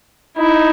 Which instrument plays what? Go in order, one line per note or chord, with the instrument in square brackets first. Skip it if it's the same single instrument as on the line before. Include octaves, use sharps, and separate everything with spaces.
[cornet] D#4 [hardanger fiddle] E4